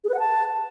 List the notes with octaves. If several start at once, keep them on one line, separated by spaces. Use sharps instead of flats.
G#4
B4
F#5
A5